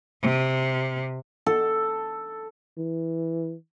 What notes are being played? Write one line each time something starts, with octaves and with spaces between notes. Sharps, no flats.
C3
A4
E3